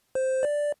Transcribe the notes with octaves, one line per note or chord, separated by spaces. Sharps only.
C5
D5